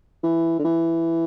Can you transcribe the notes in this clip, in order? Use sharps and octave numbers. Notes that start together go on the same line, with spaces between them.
E3
D3
E3